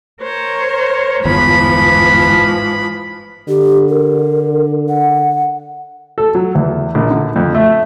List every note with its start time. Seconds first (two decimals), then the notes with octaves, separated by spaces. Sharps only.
0.22 A#4 C5 C#5
1.25 G1 E2 G#2 E3 F3 B5
3.48 D3 G4
3.89 A#4
4.89 F#5
6.18 A4
6.35 F#3
6.55 E2
6.95 A#1
7.11 D3
7.36 F2
7.55 A3